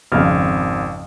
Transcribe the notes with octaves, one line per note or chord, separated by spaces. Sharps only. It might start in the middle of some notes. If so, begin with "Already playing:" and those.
G#1 F2 C#3 F6